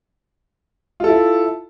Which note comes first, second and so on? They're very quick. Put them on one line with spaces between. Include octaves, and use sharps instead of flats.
F4 A4 E4